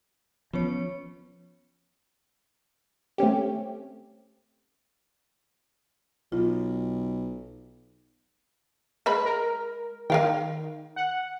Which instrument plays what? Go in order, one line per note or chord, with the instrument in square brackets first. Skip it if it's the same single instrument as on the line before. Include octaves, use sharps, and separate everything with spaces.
[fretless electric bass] F3 [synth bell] B3 C#4 C#5
[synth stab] A3 C4 C#4 G4
[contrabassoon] B1 [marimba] F4
[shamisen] G#3 B4 B5
[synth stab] A#4
[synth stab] D#3 [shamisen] A#4 F5 G5
[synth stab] F#5